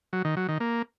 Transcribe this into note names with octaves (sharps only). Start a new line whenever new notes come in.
F#3
D#3
F#3
D#3
A#3